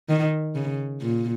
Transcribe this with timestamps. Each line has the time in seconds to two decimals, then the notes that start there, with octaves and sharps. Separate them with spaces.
0.09 D#3
0.55 C#3
1.01 A#2